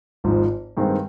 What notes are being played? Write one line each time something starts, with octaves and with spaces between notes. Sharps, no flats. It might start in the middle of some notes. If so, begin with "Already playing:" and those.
G#1 G#2 F3
G2 D#3 G#3 C4